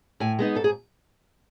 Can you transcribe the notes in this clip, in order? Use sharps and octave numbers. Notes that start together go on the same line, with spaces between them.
A2 G#5
G#3 B3 D#4
G#2 A4
G#4